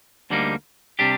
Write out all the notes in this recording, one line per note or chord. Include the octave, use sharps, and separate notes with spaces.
D2 D3 G3 A#3 D#4
C3 G3 D4 G4